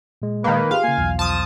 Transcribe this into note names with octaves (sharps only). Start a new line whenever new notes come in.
A#2 G#3
D#3 A#3 B4
F4 G4 G#4 F5
C#3 A#3 G#5
B1 E2
F3 A5 D#6